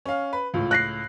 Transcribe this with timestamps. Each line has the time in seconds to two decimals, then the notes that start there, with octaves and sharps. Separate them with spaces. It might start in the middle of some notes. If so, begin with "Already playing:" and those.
0.05 C#4 F5
0.33 B4
0.54 C#2 A2 F4
0.71 F#6 A#6 C7